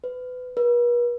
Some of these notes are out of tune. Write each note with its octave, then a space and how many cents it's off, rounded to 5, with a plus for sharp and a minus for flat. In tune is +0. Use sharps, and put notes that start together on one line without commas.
B4 +25
B4 -45